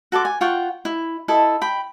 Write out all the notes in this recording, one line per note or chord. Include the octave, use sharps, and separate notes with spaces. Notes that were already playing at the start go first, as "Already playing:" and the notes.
F#4 A4 C6 D6
G#5
F4 F#5 G5 C#6
E4
E4 A4 D#5
G5 B5